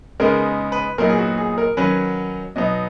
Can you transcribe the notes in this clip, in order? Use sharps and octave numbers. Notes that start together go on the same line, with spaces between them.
C#3 G#3 B3 D#4 A#4
B4
A#2 F#3 B3 D#4 A#4
G#4
F#4
G#4
A#4
D#3 F#3 C#4 B4
B2 F#3 B3 D#4 D#5